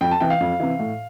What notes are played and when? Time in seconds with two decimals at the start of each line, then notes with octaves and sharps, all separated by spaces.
0.01 F2 G5
0.11 A5
0.20 C3 E3 G5
0.30 F5
0.40 F2
0.60 C3 E3
0.79 A2